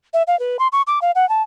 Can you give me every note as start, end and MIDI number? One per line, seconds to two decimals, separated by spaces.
0.14 0.23 76
0.27 0.38 77
0.39 0.57 71
0.59 0.68 84
0.72 0.82 85
0.87 0.99 86
1.02 1.11 77
1.15 1.28 78
1.29 1.42 81